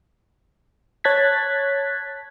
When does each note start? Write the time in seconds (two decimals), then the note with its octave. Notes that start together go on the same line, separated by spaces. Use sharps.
1.04 C#5 A5 F#6 G#6 A6 B6